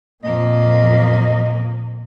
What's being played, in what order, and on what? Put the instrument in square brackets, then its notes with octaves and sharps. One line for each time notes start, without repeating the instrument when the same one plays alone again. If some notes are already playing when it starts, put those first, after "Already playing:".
[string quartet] F2 A#3 [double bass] A#2 [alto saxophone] D#5